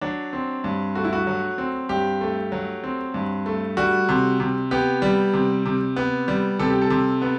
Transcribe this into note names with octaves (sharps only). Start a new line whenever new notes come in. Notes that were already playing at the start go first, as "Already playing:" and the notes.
F#3 D4
C4
G2
A3 F#4
E4
F#4
F#3
C4
G2 G4
A3
F#3
C4
G2
A3
G3 F#4
C3
C3
B3 G4
G3
C3
C3
B3
G3
C3 A4
G4
A4
C3
B3